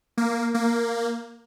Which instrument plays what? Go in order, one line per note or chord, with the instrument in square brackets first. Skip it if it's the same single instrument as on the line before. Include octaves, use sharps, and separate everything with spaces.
[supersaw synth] A#3
A#3